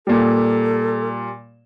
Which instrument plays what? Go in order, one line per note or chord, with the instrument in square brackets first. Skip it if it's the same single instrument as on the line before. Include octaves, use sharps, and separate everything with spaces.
[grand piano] A#2 G3 [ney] A4